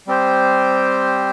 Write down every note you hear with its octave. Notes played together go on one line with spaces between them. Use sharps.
G3 C4 G4 C5